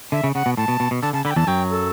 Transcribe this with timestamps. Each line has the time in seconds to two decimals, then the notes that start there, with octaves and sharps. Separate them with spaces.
0.12 D3 E5
0.24 C#3
0.35 C#3 F#5
0.46 B2
0.57 A2 A5
0.68 B2
0.80 B2
0.91 B2
1.02 D3 A5
1.13 C#3 A5
1.25 D3 B5
1.31 G5
1.36 E2 E3 A5
1.47 F#2 F#3 G5
1.71 A4